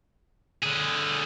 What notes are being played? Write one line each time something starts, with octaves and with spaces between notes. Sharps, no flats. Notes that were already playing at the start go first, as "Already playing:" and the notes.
D3 G#4